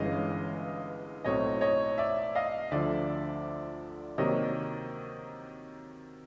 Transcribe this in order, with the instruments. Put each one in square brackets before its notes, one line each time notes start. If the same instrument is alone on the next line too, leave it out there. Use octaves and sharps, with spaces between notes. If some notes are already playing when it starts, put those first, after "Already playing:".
Already playing: [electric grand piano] G1 G2 E3 G#3 C#4 [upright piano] D#5 F5
[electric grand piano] B1 A2 F#3 A3 C4 [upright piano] C#5 D#5
[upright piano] C#5 D#5
D5 E5
D#5 F5
[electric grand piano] D2 D3 F3 [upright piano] D5 E5
[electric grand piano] C3 D#3 F#3 A#3 [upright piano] C#5 D#5